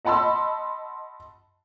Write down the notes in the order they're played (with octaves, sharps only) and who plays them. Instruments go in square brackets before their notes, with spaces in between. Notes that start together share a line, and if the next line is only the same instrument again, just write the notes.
[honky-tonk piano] D#5 F#5 A5 B5 C6 E6